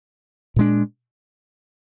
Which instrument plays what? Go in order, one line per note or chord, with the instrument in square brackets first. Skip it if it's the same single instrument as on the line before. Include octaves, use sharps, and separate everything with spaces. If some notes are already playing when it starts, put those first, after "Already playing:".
[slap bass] A#2 G#3 D4